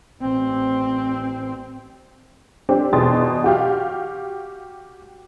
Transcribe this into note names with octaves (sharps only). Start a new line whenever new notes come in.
A1 C4
C4 D4 G4
E2 B2 G#4 G5 C6 A6
F#4 G4 F5